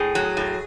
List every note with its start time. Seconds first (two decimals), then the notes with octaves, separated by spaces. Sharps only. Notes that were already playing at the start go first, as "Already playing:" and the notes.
Already playing: A2 G#4
0.15 F#3
0.37 A2